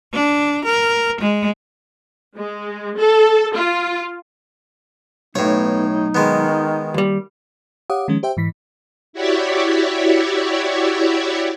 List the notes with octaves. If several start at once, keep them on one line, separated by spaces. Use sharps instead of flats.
D4
A#4
G#3
G#3
A4
F4
B1 A2 B3 D#4 C#5
D#3 G#3 B3
D#2 G3
G4 C#5 F5 F#5 D6 D#6
D#3 F3 G#3 C#4
G4 C5 E5 G5
G#2 E3 B6
E4 F#4 G4 C#5 D5 E5